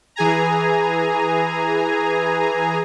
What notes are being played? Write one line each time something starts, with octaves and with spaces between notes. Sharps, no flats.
E3 G#4 G#5 A#5